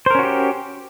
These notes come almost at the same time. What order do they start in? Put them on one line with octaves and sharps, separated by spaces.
C5 A#4 C#4 F#4 G4